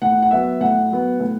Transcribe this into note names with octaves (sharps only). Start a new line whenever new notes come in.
A2 F#5
F#5
F#3 B3 E5
A2 F#5
F#3 B3
A2